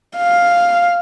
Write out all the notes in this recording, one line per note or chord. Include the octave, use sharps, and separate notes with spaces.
F5